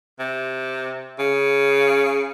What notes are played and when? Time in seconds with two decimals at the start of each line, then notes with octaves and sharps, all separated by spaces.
0.19 C3
1.19 C#3